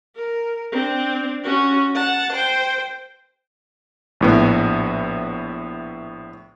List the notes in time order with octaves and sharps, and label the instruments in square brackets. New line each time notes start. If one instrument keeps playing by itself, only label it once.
[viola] A#4
C4 D4
C#4 F#4
F#5 A5
C5 G5
[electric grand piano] A#1 A2 B3